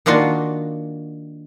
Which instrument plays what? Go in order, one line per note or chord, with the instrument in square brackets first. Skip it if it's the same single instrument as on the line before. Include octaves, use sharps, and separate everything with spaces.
[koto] D#3 A#3 D4 F4 F#4